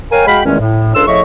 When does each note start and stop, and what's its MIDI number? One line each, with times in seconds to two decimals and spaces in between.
0.11 0.26 70
0.11 0.26 73
0.11 0.26 77
0.11 0.26 79
0.11 0.26 80
0.27 0.40 56
0.27 0.40 66
0.27 0.40 77
0.27 0.40 79
0.27 0.40 83
0.45 0.59 40
0.45 0.59 46
0.45 0.59 51
0.45 0.59 56
0.45 0.59 57
0.45 0.59 61
0.60 0.94 45
0.95 1.04 37
0.95 1.04 49
0.95 1.04 62
0.95 1.04 69
0.95 1.04 84
0.95 1.04 88
1.07 1.22 45
1.07 1.22 49
1.07 1.22 53
1.07 1.22 75
1.07 1.22 76
1.07 1.22 85